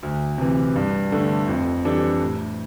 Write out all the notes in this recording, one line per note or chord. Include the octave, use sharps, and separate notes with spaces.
D2
C3 E3
G2
D3 A3
F2
E3 G3 D4 A4
A2